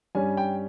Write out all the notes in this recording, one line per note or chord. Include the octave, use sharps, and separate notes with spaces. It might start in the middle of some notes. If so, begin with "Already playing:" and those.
G2 G3 C#4 G#5
G5